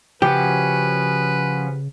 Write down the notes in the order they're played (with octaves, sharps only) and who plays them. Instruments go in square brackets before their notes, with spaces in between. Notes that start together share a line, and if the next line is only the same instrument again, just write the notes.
[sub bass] C#3 [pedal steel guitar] F3 C#4 F#4 [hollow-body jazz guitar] G4 [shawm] B4